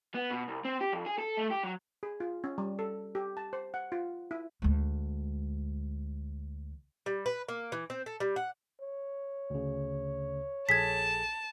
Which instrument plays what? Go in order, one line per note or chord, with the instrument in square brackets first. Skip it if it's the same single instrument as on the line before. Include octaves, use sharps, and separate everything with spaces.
[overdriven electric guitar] B3
B2
C2
C4
G4
F2
G#4
A4
A3
G4
F#3
[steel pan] G#4
F4
C#4
G3
A4
G4
A5
C5
F#5
F4
E4
[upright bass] D2 G#3
[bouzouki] G3
B4
A#3
E3
C4
A4
G3
F#5
[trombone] C#5
[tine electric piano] D2 C#3
[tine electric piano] A#1 G#4 A4 [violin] A5 [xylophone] G#6 B6